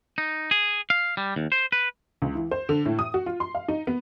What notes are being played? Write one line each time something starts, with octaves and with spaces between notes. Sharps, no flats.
D#4
G#4
F5
G3
D#2
C5
B4
C#2
E3
C5
D3
A2
D#6
F#4
F4
C6
F5
D#4
B3